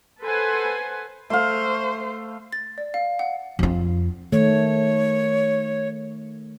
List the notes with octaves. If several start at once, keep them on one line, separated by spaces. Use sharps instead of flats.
A4 B4 C5 F#5 G#5
A3 C5 F5
A6
D5
F5
F#5
F2 F4
D#3 A3 C#5